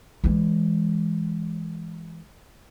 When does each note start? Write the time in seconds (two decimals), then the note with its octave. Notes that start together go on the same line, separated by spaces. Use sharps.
0.24 E3 G#3